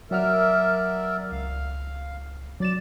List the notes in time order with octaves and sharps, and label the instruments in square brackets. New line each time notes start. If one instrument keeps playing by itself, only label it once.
[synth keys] F#3 F#5 F6 [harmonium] A#4 D5 E5
[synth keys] C#2 [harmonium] F5
[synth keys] F#3 A6 E7 [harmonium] D5